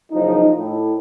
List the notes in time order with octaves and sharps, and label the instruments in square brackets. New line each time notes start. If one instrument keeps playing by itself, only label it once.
[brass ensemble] F#1 F#2 F3 D#4
A2